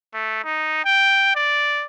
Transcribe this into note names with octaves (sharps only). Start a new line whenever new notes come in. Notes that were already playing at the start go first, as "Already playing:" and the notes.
A3
D#4
G5
D5